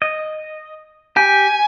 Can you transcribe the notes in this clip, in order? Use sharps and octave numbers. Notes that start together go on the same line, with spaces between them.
D#5
G4 G#5